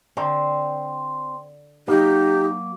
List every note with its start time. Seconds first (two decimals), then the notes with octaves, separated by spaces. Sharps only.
0.17 D3 C4
1.88 F#3 A#3 D#4 G4